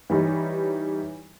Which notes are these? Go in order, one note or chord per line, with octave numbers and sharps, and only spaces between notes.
E3 G3 D#4 C#5